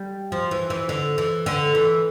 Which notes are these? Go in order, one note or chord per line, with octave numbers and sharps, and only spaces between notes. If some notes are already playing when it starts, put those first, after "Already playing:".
Already playing: G3
F3
E3
E3
D3
E3
D3
E3